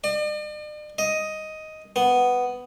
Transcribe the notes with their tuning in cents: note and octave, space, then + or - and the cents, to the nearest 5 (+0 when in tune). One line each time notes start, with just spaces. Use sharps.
D5 +45
D#5 +5
B3 +5